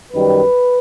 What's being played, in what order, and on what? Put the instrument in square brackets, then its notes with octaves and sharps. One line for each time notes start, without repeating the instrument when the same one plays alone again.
[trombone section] F#2 D#3 G3 B4